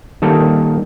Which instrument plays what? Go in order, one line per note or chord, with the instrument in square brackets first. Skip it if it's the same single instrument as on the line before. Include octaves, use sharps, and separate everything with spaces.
[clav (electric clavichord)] D#3 G3 A#3 A4